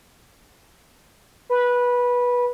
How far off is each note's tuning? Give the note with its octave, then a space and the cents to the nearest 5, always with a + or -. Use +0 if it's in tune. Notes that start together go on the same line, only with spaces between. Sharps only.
B4 -15